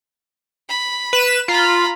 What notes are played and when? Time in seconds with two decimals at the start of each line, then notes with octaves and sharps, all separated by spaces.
0.69 B5
1.13 B4 E7
1.48 F4 A#5 B5